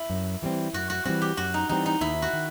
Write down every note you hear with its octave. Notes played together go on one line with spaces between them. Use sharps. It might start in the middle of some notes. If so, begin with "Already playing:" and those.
Already playing: E4
F#2
E3 G3 C4
F#2 F#4
F#4
E3 G3 C4 F#4
G4
F#2 F#4
D#4
E3 G3 C4 D#4
D#4
D#2 E4
F#4
D#3